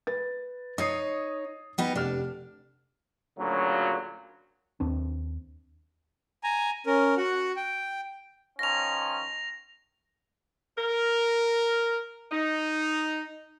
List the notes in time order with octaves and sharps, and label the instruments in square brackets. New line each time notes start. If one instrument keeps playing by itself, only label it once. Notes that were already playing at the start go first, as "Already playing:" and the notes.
[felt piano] B4 A6
[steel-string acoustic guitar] D#4 C#5 [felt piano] D#6 C7
[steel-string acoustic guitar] G3 B3 D#4
[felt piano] F1 G4 F6 [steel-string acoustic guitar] D4
[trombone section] D2 A#2 C#3 F#3
[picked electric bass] D#2 C4 D4
[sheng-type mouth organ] G#5 A#5
C#4 A#4
F#4 F#5
G5
[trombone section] D#3 F3 C#4 [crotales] A#6 F7
[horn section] A#4
D#4